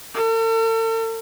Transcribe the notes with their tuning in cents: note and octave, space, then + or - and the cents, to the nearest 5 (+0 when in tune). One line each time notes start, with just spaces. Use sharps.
A4 +45